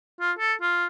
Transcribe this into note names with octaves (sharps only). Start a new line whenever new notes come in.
F4
A4
F4